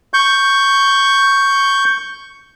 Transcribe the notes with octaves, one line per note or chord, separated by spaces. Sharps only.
C#6 G6